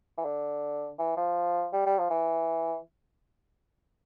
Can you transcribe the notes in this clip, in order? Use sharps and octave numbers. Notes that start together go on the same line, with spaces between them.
E3
D3
E3
F3
G3
G3
F3
E3